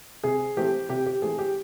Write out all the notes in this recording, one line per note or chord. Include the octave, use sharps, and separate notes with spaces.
C3 G#4
E3 A3 C4 G4
C3 G4
G4
E3 A3 C4 G#4
G4